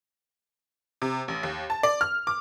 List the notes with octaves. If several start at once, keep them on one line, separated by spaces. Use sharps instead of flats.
C3
A1
D#2
A5
D5
F6
D6